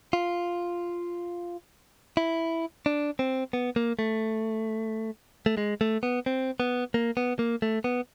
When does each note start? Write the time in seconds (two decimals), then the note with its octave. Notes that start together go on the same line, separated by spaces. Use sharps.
0.13 F4
2.17 E4
2.86 D4
3.19 C4
3.53 B3
3.76 A#3
3.99 A3
5.46 A3
5.57 G#3
5.81 A3
6.03 B3
6.26 C4
6.60 B3
6.94 A#3
7.17 B3
7.39 A#3
7.62 A3
7.84 B3